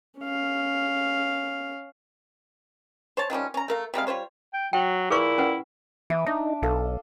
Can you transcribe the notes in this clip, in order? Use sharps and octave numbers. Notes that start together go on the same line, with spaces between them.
C#4 F5
C5 C#5 A5
D#3 F3 G3 C#4
C#4 A#5
A3 A#4 F5
C3 G3 G#3 F5
G3 F4 C5 C#5
G5
F#3 G5
A#2 E4 G#4 B4 C#6
C#4 B4 F#5
E3 E5 D6 D#6
D4 D#4
B1 A4 F5 D#6